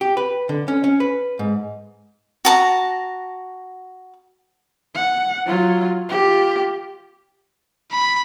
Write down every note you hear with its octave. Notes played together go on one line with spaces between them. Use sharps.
G4
B4
D3
C#4
C#4
B4
G#2
F#4 A5 A#5
F#5
F#3 F4
F4 G4
B5